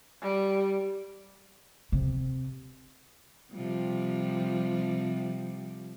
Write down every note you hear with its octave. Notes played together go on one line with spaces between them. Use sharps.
G3
C3
C3 F3 G3